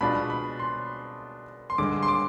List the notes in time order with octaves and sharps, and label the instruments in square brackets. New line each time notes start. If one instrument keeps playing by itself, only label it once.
[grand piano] B2 G#3 D4 F4 B5
B5
C6
C6
G2 D3 G#3 D6
C6
D6